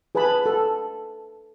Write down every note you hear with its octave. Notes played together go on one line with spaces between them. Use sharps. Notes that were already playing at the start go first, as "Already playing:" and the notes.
G#4 B4 G#5 A5 B5
A4